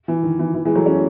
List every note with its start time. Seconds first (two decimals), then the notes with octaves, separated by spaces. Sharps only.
0.08 E3
0.23 D#3
0.39 E3
0.54 E3
0.65 E3 G#3
0.75 F#3 A3
0.86 A3 C#4